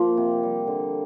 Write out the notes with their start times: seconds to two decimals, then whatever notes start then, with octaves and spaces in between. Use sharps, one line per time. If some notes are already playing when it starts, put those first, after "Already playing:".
Already playing: F3 A#3
0.17 C3
0.43 G3
0.67 D3